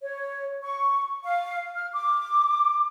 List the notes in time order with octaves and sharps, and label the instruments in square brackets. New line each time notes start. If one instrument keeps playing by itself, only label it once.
[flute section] C#5
C#6
F5
F6
D6